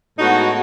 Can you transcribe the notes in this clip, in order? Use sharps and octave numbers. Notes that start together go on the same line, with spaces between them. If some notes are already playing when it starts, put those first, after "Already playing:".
A2 G#3 B3 D#4 F#4